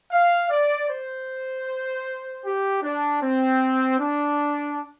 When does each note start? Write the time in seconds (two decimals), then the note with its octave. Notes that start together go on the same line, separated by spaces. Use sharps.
0.11 F5
0.50 D5
0.89 C5
2.45 G4
2.83 D4
3.22 C4
3.99 D4